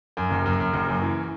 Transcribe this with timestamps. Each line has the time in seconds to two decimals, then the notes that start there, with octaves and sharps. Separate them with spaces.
0.17 F#2
0.31 F#1
0.46 F#2
0.60 F#2
0.73 F#1
0.88 F#2
1.02 E3